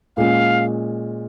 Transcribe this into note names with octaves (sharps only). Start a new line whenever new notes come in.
A#2 G#3 C#4 F5